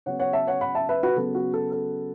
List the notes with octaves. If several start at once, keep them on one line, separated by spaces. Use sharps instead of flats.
C#3 F#3 B3 C#5 F#5
C#5 F#5
E5 A5
C#5 F#5
F#5 B5
E5 A5
B4 E5
F#4 B4
C#3 F#3 B3 A4
F#4
A4
A4